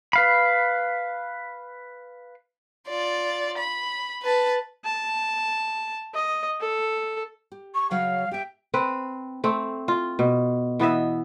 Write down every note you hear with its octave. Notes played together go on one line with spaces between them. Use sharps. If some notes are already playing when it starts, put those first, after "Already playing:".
B4 F5 B5
F4 D5
B5
B4 A5
A5
D#5
A4
G4
C#6
C#3 F#3 C#5 F5
G4 E5 G5
C4 B4
A3 C4
F4
B2
E3 B3 D#5 E5